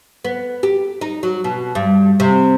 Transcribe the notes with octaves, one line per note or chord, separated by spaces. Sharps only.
B3
G4
D#4
F#3
B2
G2
C3